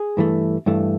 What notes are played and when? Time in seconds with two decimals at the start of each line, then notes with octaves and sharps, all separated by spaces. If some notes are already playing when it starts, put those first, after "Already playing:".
Already playing: G#4
0.17 G2 E3 A3
0.66 G2 E3 A3